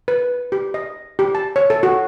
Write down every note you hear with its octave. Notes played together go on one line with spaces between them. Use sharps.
B4
G4
D#5
G4
A5
C#5
A4
F#4